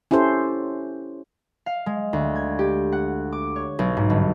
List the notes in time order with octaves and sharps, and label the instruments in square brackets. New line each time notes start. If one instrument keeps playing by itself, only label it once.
[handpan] C#4 E4 G4 A4 C5
[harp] F5
G#3
D2
G#6
G4
F#5
D6
C#5
B1
G#2
G1